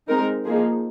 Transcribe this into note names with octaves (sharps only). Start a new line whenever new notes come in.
G#3 C4 D#4 A#4
F3 A#3 D#4 G#4